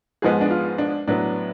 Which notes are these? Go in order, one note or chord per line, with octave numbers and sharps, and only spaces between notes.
G#2 F3 G#3 B3 G#4
D4
F4
D4
A2 F#3 B3 D4